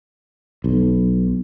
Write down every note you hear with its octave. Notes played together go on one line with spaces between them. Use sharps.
B1